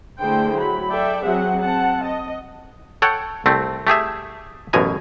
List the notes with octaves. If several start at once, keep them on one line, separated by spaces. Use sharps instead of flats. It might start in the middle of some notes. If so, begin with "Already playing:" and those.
D3 A3 E4 G#4 C5 G5
F#3 B5
A4 D5 E5 G5
F#3 C4 G#4 F#5
C4 F#5 A5
D#5
A4 C#5 F#5 G5
C2 A3 C4
A3 G4 G#4 E5
A1 F#2 B2 G#5 A#5